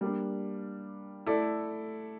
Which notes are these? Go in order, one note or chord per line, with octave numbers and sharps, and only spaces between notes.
G3 A#3 D4
A3 E4 A4 D5